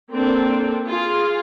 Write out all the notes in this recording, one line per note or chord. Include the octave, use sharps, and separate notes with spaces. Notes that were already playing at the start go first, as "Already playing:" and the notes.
A#3 C4 D4 A4
F4 G#4